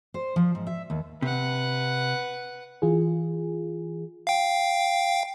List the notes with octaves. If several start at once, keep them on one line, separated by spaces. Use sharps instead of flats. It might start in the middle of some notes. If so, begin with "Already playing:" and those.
C5
F3
G#2
E5
D#2
C3 B4 F#5
E3 F4 G#4
F5 G5